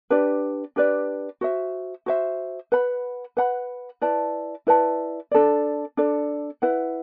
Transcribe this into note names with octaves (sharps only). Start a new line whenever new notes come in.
D4 G4 B4 D5
D4 G4 B4 D5
F#4 C5 E5
F#4 C5 E5
B4 F#5 B5
B4 F#5 B5
E4 B4 D5 A5
E4 B4 D5 A5
D4 A4 D5
D4 A4 D5
E4 B4 F#5